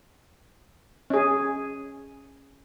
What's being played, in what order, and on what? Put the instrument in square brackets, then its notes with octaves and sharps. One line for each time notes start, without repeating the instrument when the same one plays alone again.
[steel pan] C#4 G#4